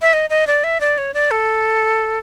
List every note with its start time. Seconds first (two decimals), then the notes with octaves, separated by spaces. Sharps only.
0.02 E5
0.13 D#5
0.30 D#5
0.47 D5
0.64 E5
0.81 D5
0.98 C#5
1.14 D5
1.31 A4